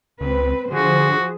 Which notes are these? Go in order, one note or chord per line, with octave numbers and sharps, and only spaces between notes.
C#2 C4 B4
D3 F3 F#4 G#4 C5